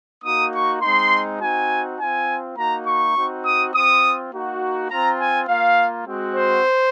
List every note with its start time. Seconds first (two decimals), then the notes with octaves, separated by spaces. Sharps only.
0.24 A#3 D#4 F#4 D#6
0.53 C#6
0.82 G#3 C4 D#4 C6
1.40 C4 D#4 F#4 G#5
1.98 C4 F4 G#5
2.57 A#3 D#4 F#4 A#5
2.86 C#6
3.16 C4 D#4 F#4
3.45 D#6
3.74 C4 F4 D#6
4.32 A#3 D#4 F#4
4.90 C4 F4 A#5
5.19 G#5
5.48 A#3 F4 F5
6.07 G#3 C4 F#4
6.36 C5